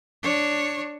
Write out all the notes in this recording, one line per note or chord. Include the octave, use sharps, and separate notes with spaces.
D4 C#5